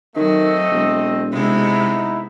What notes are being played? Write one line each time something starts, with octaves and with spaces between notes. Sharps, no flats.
D#3 F#3 A3 C4 D#5
E1
C3 G#3 B3 D#4 E4